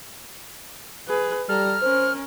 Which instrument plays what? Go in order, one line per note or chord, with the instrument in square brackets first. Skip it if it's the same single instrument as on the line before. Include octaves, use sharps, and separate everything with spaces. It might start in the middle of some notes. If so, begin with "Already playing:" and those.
[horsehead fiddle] G#4 B4
[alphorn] G3 [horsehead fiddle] A4 A#5 [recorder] F6
[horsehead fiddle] C#4 A#4 [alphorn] C5